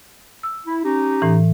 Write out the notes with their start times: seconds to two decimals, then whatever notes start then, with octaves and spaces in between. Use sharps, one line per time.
0.43 E6
0.66 E4
0.85 C#4 D#4 G4
1.22 A2 E3